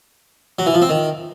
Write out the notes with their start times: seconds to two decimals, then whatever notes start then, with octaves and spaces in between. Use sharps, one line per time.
0.59 F#3
0.66 E3
0.74 F3
0.82 C4
0.89 D#3